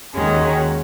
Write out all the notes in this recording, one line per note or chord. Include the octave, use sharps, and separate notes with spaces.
D#2 D#3 G#3 C#4 F#4